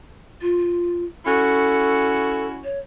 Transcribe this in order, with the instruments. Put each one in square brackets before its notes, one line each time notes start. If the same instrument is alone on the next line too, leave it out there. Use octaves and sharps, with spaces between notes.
[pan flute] F4
[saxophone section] C#4 E4 F#4 [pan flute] A4
[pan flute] C#5